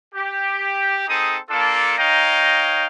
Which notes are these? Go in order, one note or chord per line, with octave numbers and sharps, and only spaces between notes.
G4
C4 D#4 G#4 A4 D#6
A#3 D4 F4 A4
D#4 C#5 D#5 F5 G5 A#5